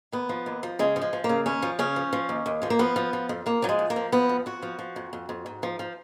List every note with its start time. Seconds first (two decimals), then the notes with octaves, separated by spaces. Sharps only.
0.12 D#2 B3
0.29 F3
0.46 D#2
0.63 F3
0.79 C#3 G#3
0.96 F3
1.02 G#3
1.13 F3
1.24 A#3
1.29 C#3
1.46 D#2 C#4
1.62 F3
1.79 C#3 C#4
1.96 F3
2.13 F3
2.29 D#2
2.46 D#2
2.62 F3 G#3
2.70 A#3
2.79 F3 B3
2.96 F3
3.13 F3
3.29 F2
3.46 F2 A#3
3.62 F3 F#3
3.69 G#3
3.79 F2
3.90 A#3
3.96 F3
4.12 F3 B3
4.29 F2
4.46 F2 F#4
4.63 F3
4.79 F3
4.96 F2
5.13 F2
5.29 F2
5.46 G#2
5.63 F3
5.79 F3